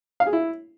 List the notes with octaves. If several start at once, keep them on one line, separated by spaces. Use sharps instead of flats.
F5
G#4
E4